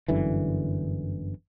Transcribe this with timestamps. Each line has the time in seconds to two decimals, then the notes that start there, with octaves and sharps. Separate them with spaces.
0.08 G1 F#2 D3 E3